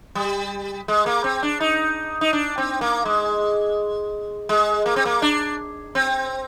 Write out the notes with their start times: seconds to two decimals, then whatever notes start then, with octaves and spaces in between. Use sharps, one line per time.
0.15 G3
0.88 G#3
1.06 A#3
1.24 C4
1.43 D4
1.60 D#4
2.21 D#4
2.33 D4
2.58 C4
2.81 A#3
3.05 G#3
4.49 G#3
4.86 A#3
4.96 C4
5.05 A#3
5.22 D4
5.95 C4